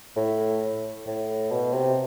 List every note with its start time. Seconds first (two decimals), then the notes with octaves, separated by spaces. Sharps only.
0.16 A2
1.07 A2
1.51 B2
1.73 C3